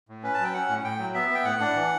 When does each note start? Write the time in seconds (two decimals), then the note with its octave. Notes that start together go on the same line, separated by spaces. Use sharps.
0.09 A2
0.23 C#4 B4
0.34 A5
0.39 F#3 G5
0.54 C#4 F#5
0.69 A2
0.84 A2 G5
0.99 F#3
1.14 B3 E5
1.30 B3 G5
1.45 A2 F#5
1.61 D4
1.75 E3